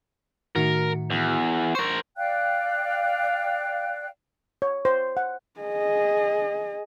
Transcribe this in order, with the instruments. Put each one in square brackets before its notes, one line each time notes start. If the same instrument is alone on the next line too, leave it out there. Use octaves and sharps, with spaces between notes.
[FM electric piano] A2 D#3 F#4 [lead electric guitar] A#4
[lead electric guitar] E2
[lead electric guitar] A#4 C5 [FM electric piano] C#6
[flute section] D5 F5 G5 F#6
[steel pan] C#5
C5
F#5
[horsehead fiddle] G#4 D#5